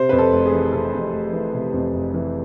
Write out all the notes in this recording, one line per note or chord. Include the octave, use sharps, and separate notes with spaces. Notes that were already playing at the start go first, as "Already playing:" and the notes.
Already playing: C3 C5
F2 B4
A4
F1
G#4
E3
C3 A4
F2
F1
E3
C3
F2
F1
E3